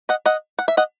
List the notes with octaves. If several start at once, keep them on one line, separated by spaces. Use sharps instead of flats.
D#5 F#5
D#5 F#5
F#5
E5
D#5 F#5